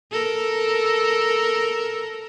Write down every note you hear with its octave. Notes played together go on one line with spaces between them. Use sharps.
A4 A#4